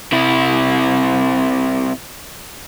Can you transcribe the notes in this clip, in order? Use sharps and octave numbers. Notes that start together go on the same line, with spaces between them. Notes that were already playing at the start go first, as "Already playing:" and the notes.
C3 E4